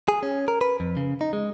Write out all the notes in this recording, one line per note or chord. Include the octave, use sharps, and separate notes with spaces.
G#4
C#4
A#4
B4
F2
C#3
D#4
G#3